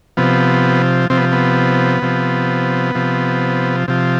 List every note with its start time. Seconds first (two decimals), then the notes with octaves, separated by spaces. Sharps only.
0.17 C3 F3 B3
1.10 C3 F3 C4
1.18 B3
1.32 B3
2.02 C3 F3
2.95 C3 F3
3.88 C3 F3